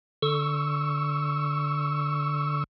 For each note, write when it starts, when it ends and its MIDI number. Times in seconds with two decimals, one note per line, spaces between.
0.22 2.64 50
0.22 2.64 85
0.22 2.64 88